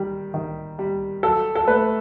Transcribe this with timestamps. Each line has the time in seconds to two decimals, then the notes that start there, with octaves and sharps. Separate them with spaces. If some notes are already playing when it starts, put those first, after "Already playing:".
Already playing: D#3 G3
0.34 D#3
0.79 G3
1.23 F#3 A4
1.55 A4
1.68 A3 B4